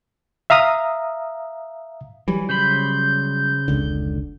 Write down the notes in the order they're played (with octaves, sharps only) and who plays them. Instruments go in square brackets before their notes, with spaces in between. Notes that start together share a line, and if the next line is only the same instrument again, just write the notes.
[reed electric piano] E5 F5 A#5 D#6
[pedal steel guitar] E3 [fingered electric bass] F#3 G3
[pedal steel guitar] C#3 C5 B5 [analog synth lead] G6
[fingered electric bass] F1 C#2 D3